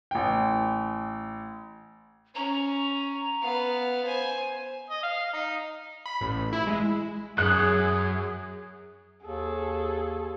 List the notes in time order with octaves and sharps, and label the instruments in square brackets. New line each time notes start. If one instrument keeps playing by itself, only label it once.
[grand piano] A1 G5
[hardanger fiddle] C#4 [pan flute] A#5
[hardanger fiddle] B3 F5
C5 G#5
[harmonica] D#5
F5
D#4
[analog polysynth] B5
A1
E4
G#3
[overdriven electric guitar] F#2 [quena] G#4 [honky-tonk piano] F#6
[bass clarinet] D#2 [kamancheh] G#4 A4